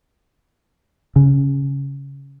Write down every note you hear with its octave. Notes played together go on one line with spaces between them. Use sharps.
C#3